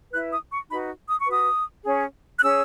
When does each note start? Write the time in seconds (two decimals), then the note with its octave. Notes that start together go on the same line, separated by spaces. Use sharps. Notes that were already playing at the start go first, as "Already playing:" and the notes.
0.12 E4 B4 F#6
0.32 D#6
0.51 C#6
0.70 D#4 F#4 B4 B5
1.07 D#6
1.20 C#6
1.27 F#4 B4 D#6
1.85 C#4 G#4 C#5
2.37 F#6
2.42 C#4 G#4 C#5 E6